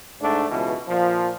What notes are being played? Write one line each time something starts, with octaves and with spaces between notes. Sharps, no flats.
G#2 A3 D4
C#2 B2 E3
A#2 F3